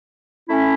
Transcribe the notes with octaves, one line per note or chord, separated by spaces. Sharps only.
A3 C#4 E4